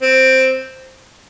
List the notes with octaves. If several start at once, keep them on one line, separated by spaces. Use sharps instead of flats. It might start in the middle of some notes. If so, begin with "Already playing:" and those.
C4